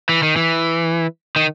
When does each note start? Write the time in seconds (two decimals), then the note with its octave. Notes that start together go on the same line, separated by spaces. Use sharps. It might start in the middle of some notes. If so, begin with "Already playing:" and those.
0.09 E3
0.23 D#3
0.36 E3
1.36 D#3